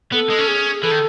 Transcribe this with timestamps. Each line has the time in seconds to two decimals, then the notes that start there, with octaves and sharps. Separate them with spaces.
0.12 B3 A4
0.30 G#3
0.39 C#4
0.48 G#4
0.83 E3 A4
0.91 D#3